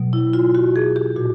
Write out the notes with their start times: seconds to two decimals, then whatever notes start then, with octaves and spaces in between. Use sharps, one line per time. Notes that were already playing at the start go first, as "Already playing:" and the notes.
Already playing: B2 F#3
0.13 E4
0.33 F4
0.55 F#4
0.76 G#4
0.96 G4
1.16 A#2 F#4